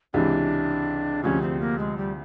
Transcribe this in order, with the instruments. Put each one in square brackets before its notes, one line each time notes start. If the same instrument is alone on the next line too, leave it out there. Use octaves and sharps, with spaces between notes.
[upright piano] C#2 C3 E3 [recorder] D4
[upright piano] D2 C3 F3 [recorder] C#4
[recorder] C4
A#3
G#3
G3